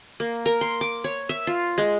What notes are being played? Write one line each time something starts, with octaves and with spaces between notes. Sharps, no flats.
A#3
A#4
C6
D6
C#5
E5
F4
G#3